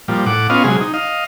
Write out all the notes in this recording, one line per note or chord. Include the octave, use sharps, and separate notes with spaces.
A#2 F3 G3
A2 F#5 D6
B3 C#4 F4 D#5 F5
C3 F#3 G#3 G#4
D#4
D#5 F5